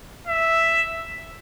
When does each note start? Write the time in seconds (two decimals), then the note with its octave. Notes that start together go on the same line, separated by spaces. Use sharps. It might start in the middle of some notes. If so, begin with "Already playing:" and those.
0.27 E5